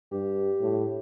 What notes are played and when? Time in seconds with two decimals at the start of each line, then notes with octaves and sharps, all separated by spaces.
0.12 G2 G4
0.61 A2